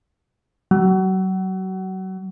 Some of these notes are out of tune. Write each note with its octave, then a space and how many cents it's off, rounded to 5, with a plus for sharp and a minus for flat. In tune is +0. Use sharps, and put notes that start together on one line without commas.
F#3 +30